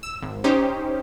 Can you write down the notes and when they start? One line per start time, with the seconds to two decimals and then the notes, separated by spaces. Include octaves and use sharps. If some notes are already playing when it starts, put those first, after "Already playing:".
0.03 E6
0.22 G#1
0.44 C#4 D#4 G4 C5